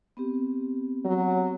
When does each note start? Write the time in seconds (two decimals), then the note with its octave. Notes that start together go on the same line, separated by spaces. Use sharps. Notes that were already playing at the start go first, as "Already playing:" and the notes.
0.17 B3 C4 G4
1.05 F#3